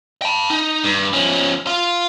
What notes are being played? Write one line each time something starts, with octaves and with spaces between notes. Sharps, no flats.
G5 A5
D#4
G2
F3 C#4
F4